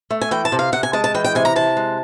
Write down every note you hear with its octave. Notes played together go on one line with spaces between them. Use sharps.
A3
G#5
E3 G5
A5
C3
F5
C3 F#5
G#5
G#3 A5
A5
E3 G5
G5
C3 G#5
A#5
C3 A5
G#3